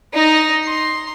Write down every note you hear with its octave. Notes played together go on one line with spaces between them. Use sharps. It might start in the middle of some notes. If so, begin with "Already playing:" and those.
D#4 D#5
C6